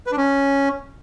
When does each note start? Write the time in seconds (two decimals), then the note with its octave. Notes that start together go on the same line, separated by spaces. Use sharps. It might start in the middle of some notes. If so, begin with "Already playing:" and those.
0.07 B4
0.12 D4
0.17 C#4